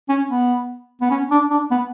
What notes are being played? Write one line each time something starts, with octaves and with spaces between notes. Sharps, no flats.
C#4
B3
B3
C#4
D4
D4
B3